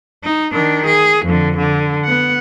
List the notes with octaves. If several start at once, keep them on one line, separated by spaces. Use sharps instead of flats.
D#4
D#3 D4
G#4
F2 D3
D3
B3 F#5